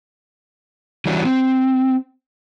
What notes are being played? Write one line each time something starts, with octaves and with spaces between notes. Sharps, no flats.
E3 G3 C#4 D4 F#4
C4